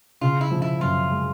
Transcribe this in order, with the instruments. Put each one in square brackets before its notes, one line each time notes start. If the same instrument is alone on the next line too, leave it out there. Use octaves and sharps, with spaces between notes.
[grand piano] C#3 [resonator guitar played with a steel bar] F4
[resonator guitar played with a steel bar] E4
[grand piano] F3
[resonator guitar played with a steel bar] E4
[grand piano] F#2 [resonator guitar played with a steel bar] F4
[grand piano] G#3